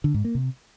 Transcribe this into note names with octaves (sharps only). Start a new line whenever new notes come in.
D3
G#2
A#3
C3